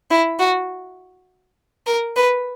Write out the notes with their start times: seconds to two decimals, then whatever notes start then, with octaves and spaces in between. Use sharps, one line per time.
0.11 E4
0.40 F#4
1.87 A#4
2.17 B4